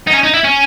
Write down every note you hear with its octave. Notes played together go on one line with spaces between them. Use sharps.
D#4
C#4
D#4
E4
C#4